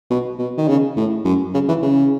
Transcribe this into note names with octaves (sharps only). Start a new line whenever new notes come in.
B2
B2
D#3
C#3
A2
F#2
C#3
E3
C#3